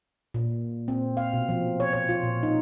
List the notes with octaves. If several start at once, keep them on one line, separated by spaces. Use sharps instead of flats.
A#2
C4
F5
B2
F3
C#5
C#5
F4
A#2
D#4